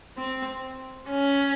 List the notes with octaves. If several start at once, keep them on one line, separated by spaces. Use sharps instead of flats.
C4
C#4